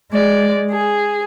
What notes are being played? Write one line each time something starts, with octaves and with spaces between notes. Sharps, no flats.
G#3 D5
G#4